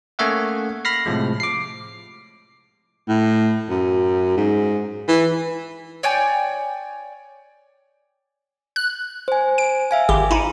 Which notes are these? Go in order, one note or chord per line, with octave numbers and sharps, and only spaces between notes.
A3 A#3 C#4 C#5 E5 F#5
B5 F6 A#6 C7
A2 C3 F3 G#3
D6 C7
A2
F#2
G#2
E3
C#5 D5 G5 G#5
F#6
C5 G#5
D7
E5 F5 G#5
G#1 G4
D#4 E4